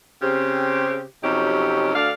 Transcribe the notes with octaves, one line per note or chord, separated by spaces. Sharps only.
C#3 C4 G4
F2 C3 F#3 C#4 D#4 G4
D2 D4 A4 F5